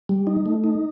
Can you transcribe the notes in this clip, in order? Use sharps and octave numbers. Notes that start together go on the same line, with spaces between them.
G3
D#4
A3
D#4